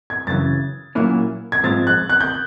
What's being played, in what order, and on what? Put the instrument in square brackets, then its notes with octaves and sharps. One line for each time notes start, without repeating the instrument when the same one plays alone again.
[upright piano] G#6
[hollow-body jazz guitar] F#2 C#3 E3 [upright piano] A6
[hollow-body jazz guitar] A#2 F#3 A#3 C#4 E4
[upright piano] G#6
[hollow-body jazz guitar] G#2 F3 G#3 C4 F4 [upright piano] A6
[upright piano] F#6
F#6
G6